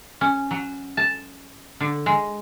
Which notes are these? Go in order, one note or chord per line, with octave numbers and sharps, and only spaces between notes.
C#4
F#3
A5
D3
G#3